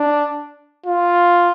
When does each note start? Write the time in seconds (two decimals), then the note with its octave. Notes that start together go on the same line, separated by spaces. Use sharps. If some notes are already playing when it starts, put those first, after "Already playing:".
Already playing: D4
0.86 F4